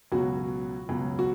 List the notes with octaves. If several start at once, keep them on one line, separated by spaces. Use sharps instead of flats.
C#2 B2 F#3 F#4
C#2 B2 F#3
F#4